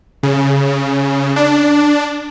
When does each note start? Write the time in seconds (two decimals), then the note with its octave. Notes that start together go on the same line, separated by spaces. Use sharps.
0.23 C#3
1.36 D4